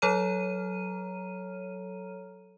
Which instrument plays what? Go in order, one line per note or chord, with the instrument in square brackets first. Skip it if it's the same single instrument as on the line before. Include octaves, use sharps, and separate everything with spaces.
[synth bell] F#3 A4 C#5 A#5 F6 D#7